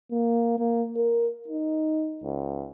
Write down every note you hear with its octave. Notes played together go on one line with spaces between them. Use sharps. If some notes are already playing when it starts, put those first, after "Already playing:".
A#3
A#3
A#4
D#4
C#2